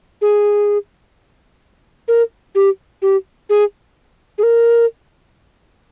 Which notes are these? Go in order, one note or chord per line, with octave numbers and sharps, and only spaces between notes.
G#4
A#4
G4
G4
G#4
G#4
A#4